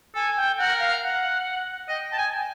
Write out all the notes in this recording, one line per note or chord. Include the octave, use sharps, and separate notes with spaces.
A4 G#5
G5
A#4 F#5
F5
F#5
D#5 G5
A5
G#5